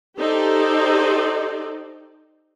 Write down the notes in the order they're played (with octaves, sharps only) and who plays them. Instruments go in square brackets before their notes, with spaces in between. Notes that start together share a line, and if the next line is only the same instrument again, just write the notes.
[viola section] D#4 G4 A4 C5 D5